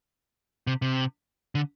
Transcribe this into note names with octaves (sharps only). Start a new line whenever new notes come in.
C3
C3
D3